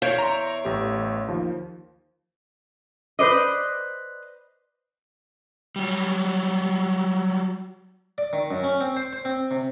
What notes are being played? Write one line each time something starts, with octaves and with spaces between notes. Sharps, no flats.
E2 C#5 E5 F5 G6 D7
A#5 C6
A1 A3 G4
D#2 F3
B4 C5 D5 D#5
F#3 G3
D5
D#3
F#2
C#4
C4
C5
C5
C4
C3